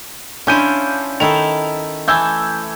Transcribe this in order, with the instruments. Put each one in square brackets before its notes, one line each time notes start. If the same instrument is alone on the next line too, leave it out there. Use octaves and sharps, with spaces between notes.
[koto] C#4 E4 F4 [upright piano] D4 G6 D#7
[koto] D#3 E4 A4 [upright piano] F7
[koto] E3 A3 [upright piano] E6 G6 G#6